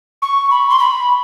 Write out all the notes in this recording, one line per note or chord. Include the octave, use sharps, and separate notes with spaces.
C#6
B5
C6
B5